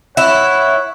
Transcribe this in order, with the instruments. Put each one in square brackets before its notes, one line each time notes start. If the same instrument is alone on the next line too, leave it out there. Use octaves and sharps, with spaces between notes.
[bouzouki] E4 [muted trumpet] C#5 [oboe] F#5